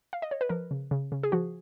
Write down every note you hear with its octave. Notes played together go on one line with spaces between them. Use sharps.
F5
D#5
C#5
B4
F3 A#4
C#3
C#3
C#3
G#4
F3 F#4